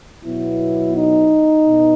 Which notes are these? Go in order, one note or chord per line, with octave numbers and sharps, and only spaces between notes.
B2 F#3 B3 E4
D#4
B2